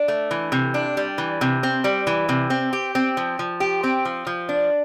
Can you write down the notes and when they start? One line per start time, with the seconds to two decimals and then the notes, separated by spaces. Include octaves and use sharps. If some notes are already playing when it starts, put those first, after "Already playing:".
Already playing: D4
0.08 A3
0.31 E3
0.52 C3
0.74 D4
0.97 G3
1.18 E3
1.41 C3
1.63 C4
1.84 G3
2.07 E3
2.29 C3
2.50 C4
2.73 G4
2.95 C4
3.17 F3
3.39 F3
3.60 G4
3.84 C4
4.05 F3
4.27 F3
4.49 D4